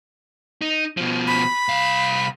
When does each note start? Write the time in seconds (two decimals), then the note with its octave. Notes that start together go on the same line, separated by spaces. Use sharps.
0.62 D#4
0.97 B2 F3
1.27 B5
1.68 C2 F5